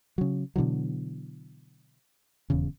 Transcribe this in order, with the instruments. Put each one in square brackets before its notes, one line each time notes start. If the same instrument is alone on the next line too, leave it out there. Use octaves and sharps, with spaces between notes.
[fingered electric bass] C#3 F#3
B2 D3 E3 F#3
D#1 E2 C#3